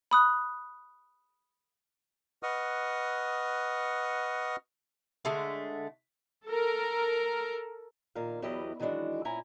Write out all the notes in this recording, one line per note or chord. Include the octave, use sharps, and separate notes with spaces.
B5 D#6 F#6
B4 D#5 F#5 C#6 D#6 F6
D3 G#3 A3
A4 A#4
A#2 D#3 A#4 F5
E2 F#3 E4 G4 B4 D#5
D#3 E3 F#3 G#3 D4 F#4
A#2 C#4 E4 G#5 A#5